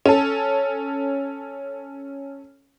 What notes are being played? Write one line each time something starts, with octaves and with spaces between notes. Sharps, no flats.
C#4 A4